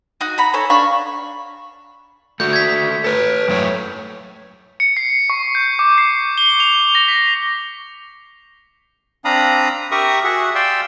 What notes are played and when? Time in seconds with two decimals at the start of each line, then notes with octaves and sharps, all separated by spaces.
0.21 D#4 F#4
0.38 F#5 A#5 B5
0.53 A4 C#5 G#5
0.70 D4 F5 B5 C#6
2.40 A3 F#4 G6
2.53 G#6 B6
3.04 A4 B4
3.48 F#2 A3 C#5
4.80 C#7
4.97 C7
5.30 C#6
5.55 G6
5.79 D6
5.98 C7
6.38 G7
6.60 F7
6.95 A#6
7.08 B6
9.25 C4 D4 F5 A#5 B5 D#6
9.91 G4 A#4 E5 C#6 D#6
10.24 F#4 G#4 E5 F#5
10.55 D5 F5 G5 C6 E6